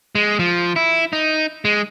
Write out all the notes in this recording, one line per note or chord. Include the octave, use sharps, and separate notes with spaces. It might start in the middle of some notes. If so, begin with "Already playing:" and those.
G#3
F3
E4
D#4
G#3